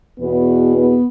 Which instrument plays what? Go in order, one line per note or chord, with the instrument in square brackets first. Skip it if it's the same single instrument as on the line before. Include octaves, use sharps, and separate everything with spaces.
[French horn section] E2 B2 B3
B3